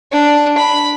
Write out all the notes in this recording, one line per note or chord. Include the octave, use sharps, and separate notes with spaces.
D4
B5